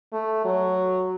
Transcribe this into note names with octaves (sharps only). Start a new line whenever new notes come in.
A3
F#3